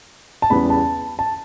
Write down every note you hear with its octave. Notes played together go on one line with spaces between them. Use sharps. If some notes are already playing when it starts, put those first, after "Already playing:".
A5
E2 C#3 G3 B3 B5
A5
A5